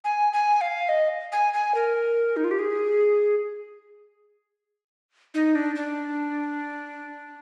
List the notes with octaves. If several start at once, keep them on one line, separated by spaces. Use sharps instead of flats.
G#5
G#5
F5
D#5
G#5
G#5
A#4
D#4
F4
G4
G#4
D#4
D4
D4